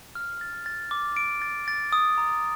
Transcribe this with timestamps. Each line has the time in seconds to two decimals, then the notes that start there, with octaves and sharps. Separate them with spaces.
0.15 F6
0.41 A6
0.66 A6
0.91 D6
1.17 D7
1.42 A6
1.68 A6
1.93 D#6
2.18 A#5